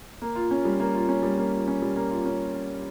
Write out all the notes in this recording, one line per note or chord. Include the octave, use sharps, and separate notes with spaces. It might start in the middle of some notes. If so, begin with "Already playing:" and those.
A#3
F4
C#4
G3
A#3
F4
C#4
G3
A#3
F4
C#4
G3
A#3
F4
C#4